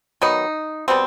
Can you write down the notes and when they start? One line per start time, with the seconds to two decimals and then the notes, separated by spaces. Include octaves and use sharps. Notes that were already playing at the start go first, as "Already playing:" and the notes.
0.22 D#3 F#3 B3 D#4
0.88 B2 G3 B3 C4